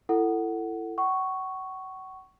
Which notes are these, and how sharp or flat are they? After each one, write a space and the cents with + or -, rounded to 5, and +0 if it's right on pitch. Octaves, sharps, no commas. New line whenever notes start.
E4 +25 A4 +20 F#5 +10
F#5 +35 C#6 +0